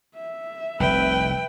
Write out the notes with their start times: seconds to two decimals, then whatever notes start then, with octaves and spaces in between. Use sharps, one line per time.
0.15 E5
0.80 F1 C2 B4 G5